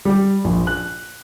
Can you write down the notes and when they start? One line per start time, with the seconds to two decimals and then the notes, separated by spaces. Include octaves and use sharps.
0.05 G3
0.44 A#1
0.67 F#6